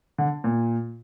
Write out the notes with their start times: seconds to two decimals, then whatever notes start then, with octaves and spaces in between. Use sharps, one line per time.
0.18 D3
0.44 A#2